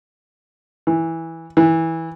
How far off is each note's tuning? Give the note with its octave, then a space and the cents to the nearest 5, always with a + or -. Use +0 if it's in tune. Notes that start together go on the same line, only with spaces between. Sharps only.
E3 -10
E3 -15